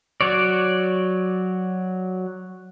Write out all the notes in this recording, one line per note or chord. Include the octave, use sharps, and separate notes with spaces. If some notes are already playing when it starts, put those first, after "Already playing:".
F#3 C#5 D5